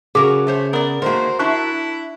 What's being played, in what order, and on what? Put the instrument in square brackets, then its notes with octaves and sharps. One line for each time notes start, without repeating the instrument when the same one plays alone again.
[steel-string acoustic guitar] C#3 [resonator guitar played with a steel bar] F#3 F#4 A#4 [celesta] G#4 D6
[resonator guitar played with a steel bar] A3 C5 C#5
[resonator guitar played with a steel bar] B3 D5 [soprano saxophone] A#4
[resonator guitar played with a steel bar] D#3 A3 A#3 [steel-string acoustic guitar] F#4 A#4 [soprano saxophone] C5
[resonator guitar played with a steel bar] D4 E5 A5 [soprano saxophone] E4 [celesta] C#6 F#6